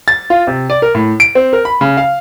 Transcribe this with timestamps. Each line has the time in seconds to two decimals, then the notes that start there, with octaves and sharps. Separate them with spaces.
0.08 A6
0.30 F4
0.47 C3
0.70 D5
0.82 A#4
0.95 A2
1.20 D7
1.35 C4
1.53 A#4
1.65 B5
1.81 C#3
1.97 F5